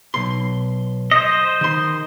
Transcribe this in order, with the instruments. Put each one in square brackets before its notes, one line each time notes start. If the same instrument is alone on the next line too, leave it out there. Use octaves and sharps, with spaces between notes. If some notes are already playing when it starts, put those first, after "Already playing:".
[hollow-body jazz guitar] B1 C6
[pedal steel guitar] C5 D#5
[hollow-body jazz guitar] D#3 C6